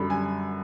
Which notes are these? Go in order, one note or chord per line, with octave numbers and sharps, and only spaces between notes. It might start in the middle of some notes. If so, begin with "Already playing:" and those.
Already playing: F#2 D3 G3 B5
G#5